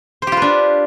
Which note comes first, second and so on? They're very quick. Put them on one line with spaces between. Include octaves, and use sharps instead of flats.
C5 G4 F4 B4 D4